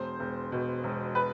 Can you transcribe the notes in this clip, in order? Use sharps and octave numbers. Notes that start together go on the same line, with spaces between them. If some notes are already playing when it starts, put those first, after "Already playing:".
Already playing: E1 C5
E1
B2
E1
B4